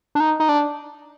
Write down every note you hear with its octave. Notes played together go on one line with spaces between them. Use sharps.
D4
D#4
D#4
D4